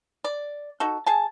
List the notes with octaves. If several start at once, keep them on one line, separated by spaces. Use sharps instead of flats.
D5
D#4 F#4 A4
G#4 G#5 A5